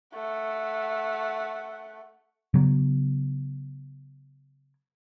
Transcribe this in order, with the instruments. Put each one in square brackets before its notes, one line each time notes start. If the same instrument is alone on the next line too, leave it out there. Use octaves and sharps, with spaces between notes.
[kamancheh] A3 F#5
[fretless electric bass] C#3 F#3 B3